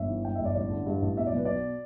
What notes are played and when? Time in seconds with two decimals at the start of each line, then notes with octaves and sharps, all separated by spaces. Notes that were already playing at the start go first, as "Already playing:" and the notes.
Already playing: G1 E5
0.09 E3
0.25 G2 G5
0.35 G1 E5
0.45 D5
0.55 A1 D5
0.71 D3
0.87 G2
1.02 A1
1.17 B2 E5
1.27 D5
1.33 B1 B4
1.45 B2 D5